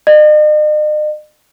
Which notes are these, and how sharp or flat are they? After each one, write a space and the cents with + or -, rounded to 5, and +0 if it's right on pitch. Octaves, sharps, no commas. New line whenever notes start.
D#5 -45